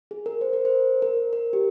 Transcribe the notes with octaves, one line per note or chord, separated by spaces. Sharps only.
G#4
A#4
C5
A#4
C5
A#4
A#4
G4